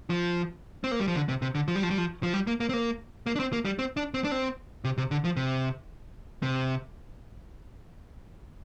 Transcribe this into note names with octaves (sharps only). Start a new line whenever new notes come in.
F3
C4
A#3
G3
F3
D3
C3
C3
D3
F3
G3
F3
G3
F3
F3
G3
A#3
A#3
C4
A#3
A#3
D4
C4
A#3
G3
C4
D4
C4
D4
C4
C3
C3
D3
F3
C3
C3